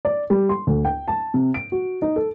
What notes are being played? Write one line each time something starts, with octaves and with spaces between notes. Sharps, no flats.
D5
G3
C6
D2
G5
A5
C3
D7
F#4
D#4
A4